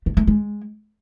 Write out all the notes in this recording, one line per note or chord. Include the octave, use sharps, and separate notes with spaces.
A3
A3
G#3